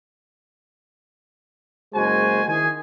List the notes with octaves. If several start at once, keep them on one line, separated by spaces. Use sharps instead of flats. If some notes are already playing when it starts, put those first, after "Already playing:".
F#1 G#3 F#4 C5 G#5
D#3 E4 G#4 G#5